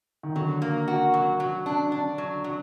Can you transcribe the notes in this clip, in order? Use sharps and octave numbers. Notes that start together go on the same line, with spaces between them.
D#3
D3 F#3
A#3
F#4
F#3
F#3
D4
D4
F#3
F#3